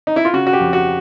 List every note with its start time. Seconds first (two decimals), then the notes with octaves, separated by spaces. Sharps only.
0.07 D#4
0.16 E4
0.25 F4
0.33 C#3 F#4
0.47 F#4
0.53 G4
0.60 F2
0.73 F#4